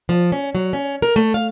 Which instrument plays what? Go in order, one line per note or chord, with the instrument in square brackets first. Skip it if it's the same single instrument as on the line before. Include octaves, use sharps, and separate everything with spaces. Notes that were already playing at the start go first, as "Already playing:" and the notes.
[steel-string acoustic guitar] F3
C#4
F#3
C#4
A#4
A3
F5